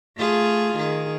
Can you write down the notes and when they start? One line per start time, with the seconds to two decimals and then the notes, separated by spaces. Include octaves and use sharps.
0.18 A3 F4 G#4
0.75 D#3 G#4